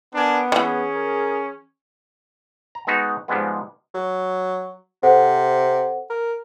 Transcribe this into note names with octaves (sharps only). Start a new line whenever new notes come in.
B3 D4 A#4 G#5
D#3 E3 C#4 G#4
A#4
A#5
G#3 B3 D#4 F#4
G#2 F3 G3 G#3 B3
F#3
C3 A4 C5 F#5
A#4